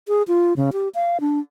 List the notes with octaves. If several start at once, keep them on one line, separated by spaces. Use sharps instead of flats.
G#4
F4
C#3
G4
F5
D4